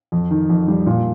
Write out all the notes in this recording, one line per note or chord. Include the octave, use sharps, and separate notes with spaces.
F2
D#3
F2
G3
A#2